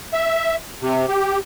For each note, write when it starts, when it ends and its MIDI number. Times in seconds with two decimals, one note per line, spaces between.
0.13 0.56 76
0.82 1.06 48
1.09 1.39 67